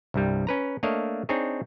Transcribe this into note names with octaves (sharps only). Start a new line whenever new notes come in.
C2 G2 G3
C#4 B4 A#5
A3 A#3 D4 C#5 D#5 F5
C4 D4 D#4 G#4 C#5